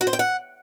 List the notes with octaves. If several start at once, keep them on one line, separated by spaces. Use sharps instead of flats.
F#4
C5
G5
F#5